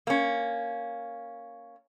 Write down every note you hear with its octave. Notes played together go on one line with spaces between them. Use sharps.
A#3 C#4